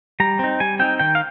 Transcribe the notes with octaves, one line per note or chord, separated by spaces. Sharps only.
G3 A#5
C4 D#4
G3 G#5
C4 D#4 G5
D#3 G5
F5